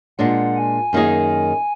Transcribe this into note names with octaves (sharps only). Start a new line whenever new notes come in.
A#2 G#3 D4 F#5
G#5
F#2 D#3 A#3 D#4 G#4